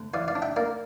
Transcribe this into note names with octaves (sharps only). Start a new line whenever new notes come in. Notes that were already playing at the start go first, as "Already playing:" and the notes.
Already playing: D2
E3 D5 F5
D5 F5
D4
E5 G5
A#3 D5 F5